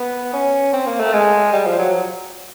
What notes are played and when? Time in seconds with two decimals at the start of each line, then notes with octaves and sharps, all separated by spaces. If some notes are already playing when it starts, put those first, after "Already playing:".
Already playing: B3
0.33 C#4
0.73 C4
0.87 A#3
1.00 A3
1.13 G#3
1.53 G3
1.67 F3
1.79 F#3